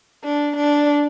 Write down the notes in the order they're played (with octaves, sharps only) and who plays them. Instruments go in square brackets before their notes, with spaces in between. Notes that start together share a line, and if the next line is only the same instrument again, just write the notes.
[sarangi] D4
D4